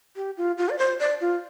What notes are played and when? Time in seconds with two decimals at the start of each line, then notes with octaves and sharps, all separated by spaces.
0.16 G4
0.37 F4
0.58 F4
0.70 D5
0.78 C5
1.00 D5
1.21 F4